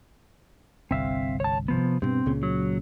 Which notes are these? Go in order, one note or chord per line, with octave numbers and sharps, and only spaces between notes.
G1 C2 C4 E5 F5
C#5 A5
C3 F3 B3
G2 B2 C4
C#2 A#2 C#3
F#3